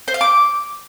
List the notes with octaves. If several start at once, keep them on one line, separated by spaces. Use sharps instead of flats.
C5
F5
D6